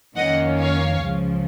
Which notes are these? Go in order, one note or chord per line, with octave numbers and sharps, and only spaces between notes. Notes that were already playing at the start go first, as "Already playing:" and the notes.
F2 D#3 A#3 C#4 D#5 F#5
C#5 F5
C#2 C#3 F3